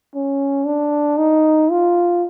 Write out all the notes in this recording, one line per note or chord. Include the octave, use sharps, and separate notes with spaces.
C#4
D4
D#4
F4